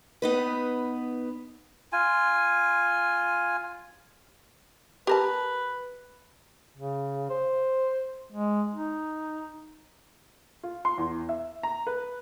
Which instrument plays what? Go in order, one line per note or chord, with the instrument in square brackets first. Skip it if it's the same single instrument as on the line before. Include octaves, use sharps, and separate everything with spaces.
[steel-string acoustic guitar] B3 D#4 B4
[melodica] F4 G#5
[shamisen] G4 A#4 A5 [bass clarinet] B4
[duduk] C#3
C5
G#3
D#4
[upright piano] F4
C6
E2
E5
A#5
B4